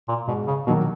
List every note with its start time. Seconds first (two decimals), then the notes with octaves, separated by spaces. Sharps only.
0.08 A#2
0.27 G#2 B2
0.47 C#3
0.67 B2 D#3 F#3 A#3